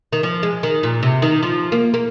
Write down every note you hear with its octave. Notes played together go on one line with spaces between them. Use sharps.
D#3
F3
G#3
D#3
A#2
C3
D#3
F3
A#3
A#3